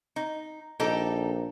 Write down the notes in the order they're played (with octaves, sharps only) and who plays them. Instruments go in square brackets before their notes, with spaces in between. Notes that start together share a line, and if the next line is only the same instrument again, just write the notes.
[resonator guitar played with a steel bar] D#4
[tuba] A#1 [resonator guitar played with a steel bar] D#4 G4 A4